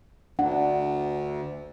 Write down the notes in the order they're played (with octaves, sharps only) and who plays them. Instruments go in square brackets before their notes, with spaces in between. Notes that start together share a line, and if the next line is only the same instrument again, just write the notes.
[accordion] D2 [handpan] D4 [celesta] F#5